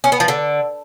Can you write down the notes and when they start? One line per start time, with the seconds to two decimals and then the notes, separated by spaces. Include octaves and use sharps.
0.04 C#4
0.12 B3
0.20 F3
0.28 D3